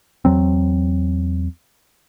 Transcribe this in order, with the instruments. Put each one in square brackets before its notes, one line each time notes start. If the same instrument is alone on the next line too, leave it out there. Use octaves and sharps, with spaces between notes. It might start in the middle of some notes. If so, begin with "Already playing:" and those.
[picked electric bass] E2 F#3 C4